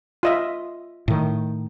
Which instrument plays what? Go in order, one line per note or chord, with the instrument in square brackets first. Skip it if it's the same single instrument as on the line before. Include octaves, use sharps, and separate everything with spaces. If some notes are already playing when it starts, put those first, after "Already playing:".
[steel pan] F4 D#5 E5
[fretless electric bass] A2 D#3